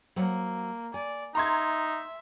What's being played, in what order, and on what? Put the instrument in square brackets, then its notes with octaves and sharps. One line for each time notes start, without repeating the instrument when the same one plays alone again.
[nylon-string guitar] F#3 C5 F#5 [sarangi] A#3
[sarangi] D5 [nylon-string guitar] G#5
[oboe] D#4 [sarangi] E5 [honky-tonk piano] A#5 C6 G#6